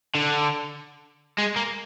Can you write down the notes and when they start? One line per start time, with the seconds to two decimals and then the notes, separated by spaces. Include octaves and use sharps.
0.15 D3
1.39 G#3
1.56 A#3